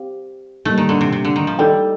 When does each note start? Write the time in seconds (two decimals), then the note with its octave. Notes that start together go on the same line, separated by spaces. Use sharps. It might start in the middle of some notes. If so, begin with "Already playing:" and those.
Already playing: C4 G4 C5 F5
0.65 G3 A3 A#3 D#4
0.78 D#3
0.89 D3
1.01 C3
1.12 C3
1.25 D3
1.36 D#3
1.47 F3
1.59 G3 D#4 A4 D5 G5